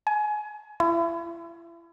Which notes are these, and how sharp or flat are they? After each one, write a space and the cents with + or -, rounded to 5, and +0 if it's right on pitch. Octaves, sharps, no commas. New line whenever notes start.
G#5 +25
E4 +35